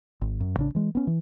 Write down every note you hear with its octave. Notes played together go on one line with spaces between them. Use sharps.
G#1
F#2
A1 C#3 D4
E3 G#3
B3 C#4
E3